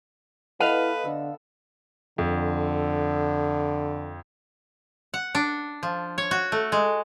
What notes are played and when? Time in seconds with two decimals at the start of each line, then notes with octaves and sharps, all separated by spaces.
0.60 B3 E4 A4 B4 D#5 F5
1.05 D3 E6
2.18 F2 D3
5.14 F#5
5.35 D4
5.83 F3
6.18 C#5
6.31 F#4
6.52 A3
6.72 G#3